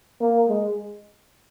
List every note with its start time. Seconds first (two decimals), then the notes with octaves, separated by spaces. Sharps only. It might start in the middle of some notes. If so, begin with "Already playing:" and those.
0.21 A#3
0.49 G#3